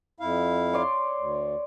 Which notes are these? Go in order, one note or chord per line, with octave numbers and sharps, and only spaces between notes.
F2 E4 F5
C#5 D5 C6
D2